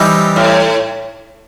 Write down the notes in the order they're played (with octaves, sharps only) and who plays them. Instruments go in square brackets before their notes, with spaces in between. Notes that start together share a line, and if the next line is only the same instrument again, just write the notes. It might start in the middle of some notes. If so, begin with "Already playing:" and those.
Already playing: [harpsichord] E3 G3 C4 D#4 G4
[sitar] A2